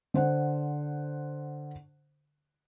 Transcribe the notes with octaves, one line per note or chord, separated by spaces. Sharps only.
D3 C5 F#5